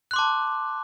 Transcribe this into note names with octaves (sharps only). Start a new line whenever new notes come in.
A5 C6 D6 F#6